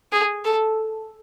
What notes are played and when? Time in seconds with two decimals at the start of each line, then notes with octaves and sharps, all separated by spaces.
0.12 G#4
0.45 A4